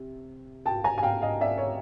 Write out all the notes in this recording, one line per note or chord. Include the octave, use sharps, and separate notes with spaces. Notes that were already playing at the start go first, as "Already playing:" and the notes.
Already playing: C3
G5 A5
G#5 A#5
G#5
F5 G5
D#5 F5
D5 E5
C#5